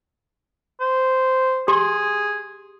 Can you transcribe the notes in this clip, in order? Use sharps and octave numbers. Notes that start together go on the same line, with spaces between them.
C5
G4 G#4 C6